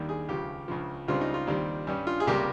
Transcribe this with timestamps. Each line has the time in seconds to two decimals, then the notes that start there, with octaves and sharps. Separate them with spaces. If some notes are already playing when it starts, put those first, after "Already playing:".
Already playing: D#2 D#3 G3
0.09 G#4
0.29 C#2 C#3 F3 G4
0.68 C#2 C#3 F3
1.08 C#2 C#3 G3 C4 F4
1.21 D#4
1.34 F4
1.47 D#2 D#3 G3 C4
1.87 G2 G3 C#4
2.07 F4
2.20 G#4
2.27 C#2 C3 G3 A#3 G4